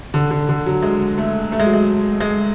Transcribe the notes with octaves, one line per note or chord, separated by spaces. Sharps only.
D3
D3
D3
F#3
G#3
A3
A3
G#3
F#3
G#3
G#3